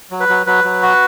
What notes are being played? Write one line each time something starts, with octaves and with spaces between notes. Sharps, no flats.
F#3
B4
F#3
F#3 B4
F#3
F#4